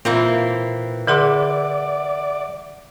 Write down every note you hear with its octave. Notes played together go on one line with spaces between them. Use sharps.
A#2 E3 A#3 C4
D3 G#4 D5 E5 F#5 C6 D6